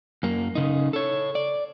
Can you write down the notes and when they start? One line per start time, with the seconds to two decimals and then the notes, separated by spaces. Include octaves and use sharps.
0.23 F#2 A#3
0.55 C#3 D#4
0.93 A4 C#5
1.35 D5